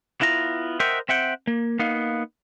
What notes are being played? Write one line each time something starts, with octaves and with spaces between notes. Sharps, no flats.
B3 E4 F4 A#5
A#4 C5 D#5 E5 F#5 G5
C4 E5 F#5 G5
A#3
A#3 B3 D#4 F5